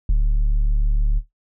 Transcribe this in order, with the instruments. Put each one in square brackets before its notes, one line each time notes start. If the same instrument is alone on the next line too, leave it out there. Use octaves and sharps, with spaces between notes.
[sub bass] D1